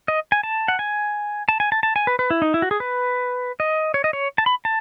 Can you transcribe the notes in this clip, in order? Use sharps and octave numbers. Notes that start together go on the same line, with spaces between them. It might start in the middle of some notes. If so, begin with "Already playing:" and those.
D#5
G#5
A5
F#5
G#5
A5
G#5
A5
A5
G#5
B4
B4
E4
D#4
E4
F#4
G#4
B4
D#5
C#5
D#5
C#5
A5
B5
A5